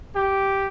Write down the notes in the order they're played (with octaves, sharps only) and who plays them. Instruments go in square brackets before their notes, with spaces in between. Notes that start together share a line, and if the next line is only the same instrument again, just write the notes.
[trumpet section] G4